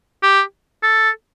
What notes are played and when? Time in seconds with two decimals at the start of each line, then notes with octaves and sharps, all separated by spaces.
0.23 G4
0.83 A4